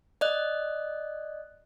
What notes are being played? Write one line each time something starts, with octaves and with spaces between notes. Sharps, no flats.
D5 D#5 F#6